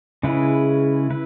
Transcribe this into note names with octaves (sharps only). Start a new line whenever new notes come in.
C#3 G#3 C#4 E4 B4
E4 B4